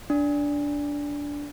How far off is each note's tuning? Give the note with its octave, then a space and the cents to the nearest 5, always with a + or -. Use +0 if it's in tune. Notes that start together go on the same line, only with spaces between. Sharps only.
D4 -15